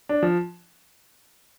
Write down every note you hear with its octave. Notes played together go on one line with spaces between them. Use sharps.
D4
F3